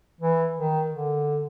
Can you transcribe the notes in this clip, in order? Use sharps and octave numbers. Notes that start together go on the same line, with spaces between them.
E3
D#3
D3